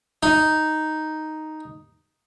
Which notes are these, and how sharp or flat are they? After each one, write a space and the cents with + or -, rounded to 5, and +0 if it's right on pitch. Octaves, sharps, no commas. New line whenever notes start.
D#4 +0